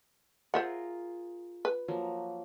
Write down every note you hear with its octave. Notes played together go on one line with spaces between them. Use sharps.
F4 G#4 A#4 C5 E5 F#5
B4
F3 F#3 A#3